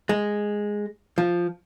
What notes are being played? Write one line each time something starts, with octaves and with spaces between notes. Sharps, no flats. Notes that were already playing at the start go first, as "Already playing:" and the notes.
G#3
F3